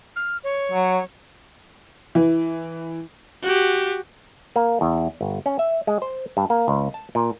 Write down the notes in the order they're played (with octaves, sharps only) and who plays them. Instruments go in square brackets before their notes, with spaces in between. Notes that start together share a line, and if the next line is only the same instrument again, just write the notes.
[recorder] F6
C#5
[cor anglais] F#3
[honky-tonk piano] E3
[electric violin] F#4 G4
[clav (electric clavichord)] A#3
E2
G1
C#4
E5
G#3
C5
G2
A#3
C#2
A5
A#2